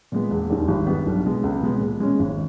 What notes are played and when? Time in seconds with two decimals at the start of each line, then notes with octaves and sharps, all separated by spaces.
0.12 A#2 G#3 B3
0.31 E1
0.50 D#2 D#3 G3
0.68 G#1
0.86 G2 G3 B3
1.06 B1
1.24 B2 G#3 B3
1.43 C#2
1.63 B2 G#3 B3
1.80 A#2
2.00 G#3 C#4
2.19 G#1